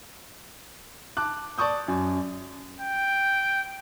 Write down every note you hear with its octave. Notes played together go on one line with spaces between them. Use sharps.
A5 D6 F#6
D5 A5 C#6 D#6 G6
F#2
G5